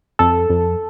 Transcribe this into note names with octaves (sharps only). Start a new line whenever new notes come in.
F2 A4
F2